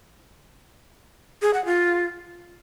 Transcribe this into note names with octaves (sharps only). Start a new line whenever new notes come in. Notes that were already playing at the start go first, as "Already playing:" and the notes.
G#4
F#5
F4